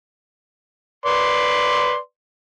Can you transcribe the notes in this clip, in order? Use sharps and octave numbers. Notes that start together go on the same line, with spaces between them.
B4 D5 C6